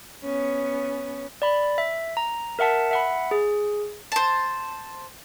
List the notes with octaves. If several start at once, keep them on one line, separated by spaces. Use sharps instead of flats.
B3 C#4
D5 B5
E5
A#5
A#4 E5 F#5 A5
E5 F#5 B5
G#4
C5 A5